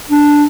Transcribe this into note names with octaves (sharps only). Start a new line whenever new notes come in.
D4